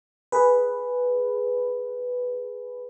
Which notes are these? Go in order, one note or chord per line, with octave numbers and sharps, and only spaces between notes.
G#4 B4